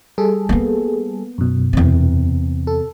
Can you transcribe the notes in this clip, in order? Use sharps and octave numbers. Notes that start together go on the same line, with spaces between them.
G3 G#4 A4
A#3 B3
F#2 B2
E2 C3
A4